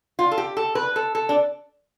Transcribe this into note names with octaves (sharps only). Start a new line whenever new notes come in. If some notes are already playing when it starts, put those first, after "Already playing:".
F4
A4
G4
A4
B4
A4
A4
D4